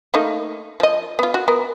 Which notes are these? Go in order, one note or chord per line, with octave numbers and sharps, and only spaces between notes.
A3 A#3 D#4
F3 D#5
B3 F4
F#4
B3 A#4